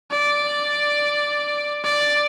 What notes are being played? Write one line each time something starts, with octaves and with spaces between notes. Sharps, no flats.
D5
D5